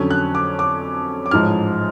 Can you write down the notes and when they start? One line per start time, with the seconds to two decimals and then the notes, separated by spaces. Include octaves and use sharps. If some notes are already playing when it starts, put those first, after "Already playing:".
Already playing: F2 D3 F#3 C#4
0.10 F#6
0.35 D6
0.59 D6
1.26 D6
1.31 A1 G#2 F3 G#3 F6